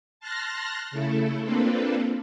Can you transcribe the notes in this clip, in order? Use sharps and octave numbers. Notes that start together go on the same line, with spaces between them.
A5 C6 F6 F#6 A6 A#6
C#3 A3 E4 A4
A#3 C4 D4 F4 A4 B4